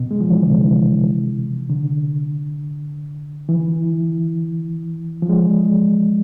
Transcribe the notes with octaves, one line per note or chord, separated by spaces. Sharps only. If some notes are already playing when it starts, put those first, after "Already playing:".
Already playing: B2
G#3
F3
E3
D3
C3
D3
E3
F3
G#3